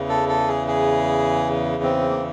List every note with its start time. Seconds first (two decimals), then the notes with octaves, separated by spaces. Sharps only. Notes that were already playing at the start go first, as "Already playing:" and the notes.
Already playing: E2 C#3 E3
0.09 A4
0.29 A4
0.48 G#4
0.68 G#4
1.83 C4
2.10 A#3